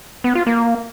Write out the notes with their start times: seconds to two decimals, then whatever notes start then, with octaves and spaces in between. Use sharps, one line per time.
0.24 B3
0.35 F4
0.47 A#3